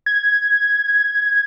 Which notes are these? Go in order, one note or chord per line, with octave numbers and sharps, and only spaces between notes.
G#6